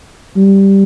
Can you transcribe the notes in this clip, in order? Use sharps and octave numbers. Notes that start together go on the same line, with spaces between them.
G3